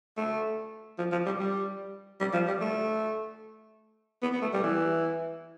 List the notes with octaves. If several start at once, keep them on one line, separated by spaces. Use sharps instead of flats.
A3
F3
F3
G3
G3
G3
F3
G3
A3
B3
B3
A3
G3
E3